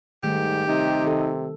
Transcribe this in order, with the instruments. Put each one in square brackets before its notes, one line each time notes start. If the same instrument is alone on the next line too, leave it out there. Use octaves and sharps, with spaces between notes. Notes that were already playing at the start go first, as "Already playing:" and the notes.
[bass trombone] G#2 [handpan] D#3 G3 A3 [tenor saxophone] G4
[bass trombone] C3 [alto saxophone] D#4
[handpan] D#3 A4